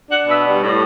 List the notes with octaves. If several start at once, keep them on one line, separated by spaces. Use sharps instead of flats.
D4 F#5
B2 E5
G3
A2